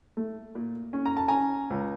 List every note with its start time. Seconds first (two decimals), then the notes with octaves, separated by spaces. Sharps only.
0.17 A3
0.55 A#2
0.93 C#4
1.06 A#5
1.17 A5
1.28 C#4 G#5 A#5
1.70 C#2